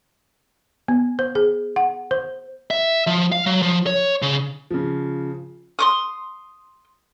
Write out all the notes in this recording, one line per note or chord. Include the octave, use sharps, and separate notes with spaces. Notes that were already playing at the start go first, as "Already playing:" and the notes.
B3
C5
G#4
F#5
C5
E5
F3
F5
F#3
F3
C#5
C#3
C#3 F3
C6 D6 D#6